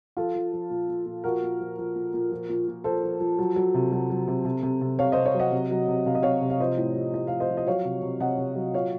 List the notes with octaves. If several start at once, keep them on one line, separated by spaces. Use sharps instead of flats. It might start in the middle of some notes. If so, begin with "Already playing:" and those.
F3 F4 A4
F3
F3
A#2
A#2
A#2
F3 F#4 A#4
A#2
F3
F3
A#2
A#2
F3
A#2
A#2
F3 A4 C5
F3
F3
F#3
F#3
C3
F#3
F#3
C3
C3
C3
C3
C3 C#5 F5
C3 C5 D#5
C#5 F5
F#3
D#5 F#5
C3
F#3
C3
C3 F5
D#5
C3 C#5 F5
C3
F5
F3 C5 D#5
A2
F3
A2 D#5
F3 F5
C5 D#5
F3
D#5
F#3 C#5 F5
C3
C3
C3 D#5 F#5
C3
F#3
A#2 C#5 F5